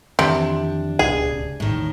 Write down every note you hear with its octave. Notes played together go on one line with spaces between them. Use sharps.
F2 C3 D#3 E3 D4
D1 C#2 B2 G#4
E1 A1 D#2 A2 D#3